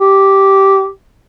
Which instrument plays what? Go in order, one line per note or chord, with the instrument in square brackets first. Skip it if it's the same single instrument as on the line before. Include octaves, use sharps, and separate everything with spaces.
[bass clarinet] G4